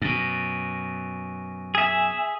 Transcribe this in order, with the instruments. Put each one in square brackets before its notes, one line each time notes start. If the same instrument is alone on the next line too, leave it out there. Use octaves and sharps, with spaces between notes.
[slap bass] F#2 B2
[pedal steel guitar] G#4 E5 [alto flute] G#5